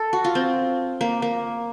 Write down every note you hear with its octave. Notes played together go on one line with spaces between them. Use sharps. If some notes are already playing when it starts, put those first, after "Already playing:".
Already playing: A4
F#4
F4
C4
A#3
A#3